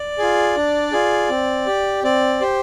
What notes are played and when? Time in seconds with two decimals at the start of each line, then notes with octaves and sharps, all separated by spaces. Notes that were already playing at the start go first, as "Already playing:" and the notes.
Already playing: D5
0.18 F4 G#4
0.56 D4
0.92 F4 G#4
1.30 C4
1.66 G4
2.04 C4 D5
2.41 G4 C5